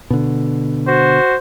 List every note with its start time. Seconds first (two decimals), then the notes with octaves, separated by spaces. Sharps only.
0.10 B2 D3
0.87 F#4 C5